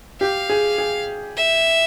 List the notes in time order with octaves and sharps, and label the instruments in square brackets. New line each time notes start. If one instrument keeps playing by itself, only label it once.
[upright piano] G4 [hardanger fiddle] F5
[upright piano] G#4
G#4
[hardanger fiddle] E5